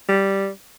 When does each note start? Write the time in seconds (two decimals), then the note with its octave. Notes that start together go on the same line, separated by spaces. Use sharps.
0.09 G3